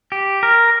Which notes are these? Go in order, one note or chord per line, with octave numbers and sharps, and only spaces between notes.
G4
A#4